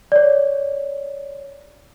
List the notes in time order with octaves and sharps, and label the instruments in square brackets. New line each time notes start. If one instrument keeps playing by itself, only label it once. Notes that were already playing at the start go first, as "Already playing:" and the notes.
[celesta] C#5 D5